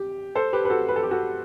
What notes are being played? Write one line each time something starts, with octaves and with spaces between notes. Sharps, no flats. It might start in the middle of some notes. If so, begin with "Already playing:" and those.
Already playing: G4
A4 C5
G4 B4
B4
F#4 A4
B4
A4
G4
F#4 A4